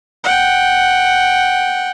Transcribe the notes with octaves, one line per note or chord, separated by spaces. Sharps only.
F#5 G5